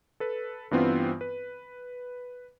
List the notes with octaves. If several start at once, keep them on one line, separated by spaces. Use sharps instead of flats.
A4 B4
G2 E3 B3 C4 F4
B4